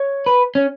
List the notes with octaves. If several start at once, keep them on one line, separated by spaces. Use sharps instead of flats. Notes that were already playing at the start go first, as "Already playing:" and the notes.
Already playing: C#5
B4
C#4